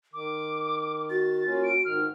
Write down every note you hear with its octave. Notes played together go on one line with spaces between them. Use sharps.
D#3 D6
F#4 A6
A#3 C#4 F4
D7
G#2 D#3 F6